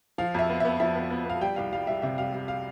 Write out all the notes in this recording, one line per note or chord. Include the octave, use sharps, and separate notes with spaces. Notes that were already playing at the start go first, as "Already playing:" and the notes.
F3 F5
F2 E5
B3
B3 E5
F3 E5
B3
B3
B3 F5
G3 G5
C2 F5
G3 F5
G3 E5
C3 E5
G3 F5
G3
F5